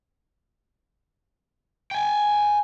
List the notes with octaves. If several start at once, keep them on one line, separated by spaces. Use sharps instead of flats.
G5 G#5